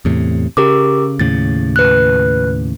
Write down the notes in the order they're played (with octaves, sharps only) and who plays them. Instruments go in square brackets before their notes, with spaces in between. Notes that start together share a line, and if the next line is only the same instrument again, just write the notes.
[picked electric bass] E2 A2 C3
[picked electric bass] C#3 [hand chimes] G4 A#4 D6
[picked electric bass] D#2 A2 C#3 [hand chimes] A6
[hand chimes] B4 F#6